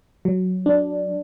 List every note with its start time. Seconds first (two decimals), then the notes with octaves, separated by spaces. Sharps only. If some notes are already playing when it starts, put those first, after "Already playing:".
0.25 F#3
0.66 D4